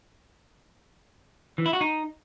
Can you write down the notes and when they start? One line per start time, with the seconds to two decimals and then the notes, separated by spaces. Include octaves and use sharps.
1.58 E3
1.66 E4
1.73 F#4
1.81 D#4